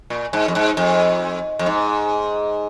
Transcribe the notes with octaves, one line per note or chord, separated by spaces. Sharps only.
A#2
G#2
F2
G#2
F2
F2
G#2